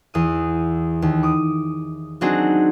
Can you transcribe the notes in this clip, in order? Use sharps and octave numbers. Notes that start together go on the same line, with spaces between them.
E2 D#6
D#2
D6 D#6
F#3 C4 D4 D#4 F#4 G#4